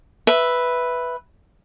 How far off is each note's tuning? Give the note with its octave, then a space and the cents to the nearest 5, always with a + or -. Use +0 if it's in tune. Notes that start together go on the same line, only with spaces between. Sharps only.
B4 +0 E5 +0